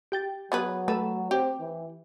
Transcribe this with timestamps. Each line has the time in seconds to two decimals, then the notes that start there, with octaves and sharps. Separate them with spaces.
0.12 G4 G5 A6
0.52 F#3 B3 G#4 B4
0.88 A3 A4 B4 E7
1.31 C4 G4
1.60 E3